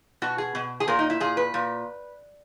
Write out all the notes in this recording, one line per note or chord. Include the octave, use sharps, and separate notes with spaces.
B2 F#4
G#4
B2
G#4
A#2 A#4
D#4
E4
A#2 G#4
B4
A#2